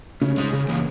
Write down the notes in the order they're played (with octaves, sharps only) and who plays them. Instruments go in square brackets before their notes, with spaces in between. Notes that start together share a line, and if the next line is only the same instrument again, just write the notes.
[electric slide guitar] C#3 [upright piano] C#4
[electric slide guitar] G#3 D#4 G#4
C#3
E3 A#3